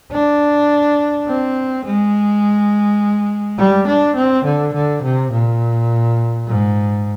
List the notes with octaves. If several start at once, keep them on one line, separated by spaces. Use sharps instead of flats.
D4
C4
G#3
G3
D4
C4
D3
D3
C3
A#2
G#2